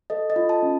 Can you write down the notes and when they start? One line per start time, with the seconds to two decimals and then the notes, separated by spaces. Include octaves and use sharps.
0.10 A4 D#5
0.30 D#5
0.36 F4
0.49 A5
0.63 C#4